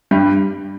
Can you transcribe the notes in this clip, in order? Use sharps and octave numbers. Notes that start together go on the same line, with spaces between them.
G2 G3